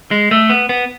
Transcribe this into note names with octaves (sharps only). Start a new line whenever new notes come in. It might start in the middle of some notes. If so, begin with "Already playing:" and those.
G#3
A3
B3
B3